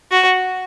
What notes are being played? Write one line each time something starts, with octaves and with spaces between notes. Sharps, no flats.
F#4